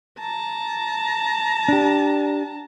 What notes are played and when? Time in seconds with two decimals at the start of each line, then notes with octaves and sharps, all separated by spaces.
0.19 A5 A#5
1.68 D4 G4